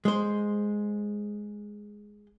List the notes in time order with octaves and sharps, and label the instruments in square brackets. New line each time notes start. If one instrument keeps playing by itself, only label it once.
[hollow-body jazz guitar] G#3 C5